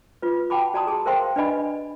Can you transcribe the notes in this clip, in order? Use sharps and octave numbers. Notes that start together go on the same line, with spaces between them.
F4 B4
F#4 F#5 G5 A5 B5 D6
F#4 D5 A5 A#5 C6 D#6
G#4 A5
A#4 C5 F5 G5 C6
D4 B4 D5 D#5 G#5 B5